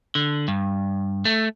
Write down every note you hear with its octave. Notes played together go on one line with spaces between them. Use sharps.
D3
G2
A3